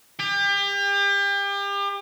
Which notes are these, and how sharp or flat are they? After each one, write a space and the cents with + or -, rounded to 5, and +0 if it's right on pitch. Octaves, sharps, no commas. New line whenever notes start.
G4 +35